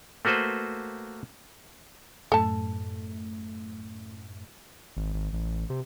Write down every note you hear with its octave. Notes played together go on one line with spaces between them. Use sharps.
A3 A#3 F#4 B4 C5
F#2 A2 A3 A4 A5
G#1
G#1
A1
C3